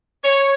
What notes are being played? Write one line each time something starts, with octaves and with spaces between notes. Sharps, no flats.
C#5